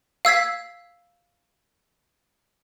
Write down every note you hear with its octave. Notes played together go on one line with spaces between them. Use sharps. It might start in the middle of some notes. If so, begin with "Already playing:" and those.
F5 E6 G#6 B6